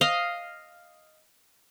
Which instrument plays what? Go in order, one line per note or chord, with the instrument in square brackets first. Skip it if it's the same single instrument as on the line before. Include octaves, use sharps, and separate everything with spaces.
[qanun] D#5 F5